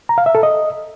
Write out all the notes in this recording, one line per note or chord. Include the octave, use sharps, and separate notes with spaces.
A#5
F5
E5
A4
D#5